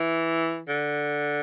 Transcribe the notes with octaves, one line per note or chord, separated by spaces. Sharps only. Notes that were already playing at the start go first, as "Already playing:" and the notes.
Already playing: E3
D3